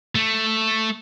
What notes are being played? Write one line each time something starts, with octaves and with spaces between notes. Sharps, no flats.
A3